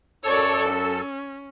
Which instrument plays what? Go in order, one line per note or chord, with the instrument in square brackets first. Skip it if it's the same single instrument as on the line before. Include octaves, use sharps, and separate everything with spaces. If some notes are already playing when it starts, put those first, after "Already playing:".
[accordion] F#2 A4 E6 [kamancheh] C#5 D5
[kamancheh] C#4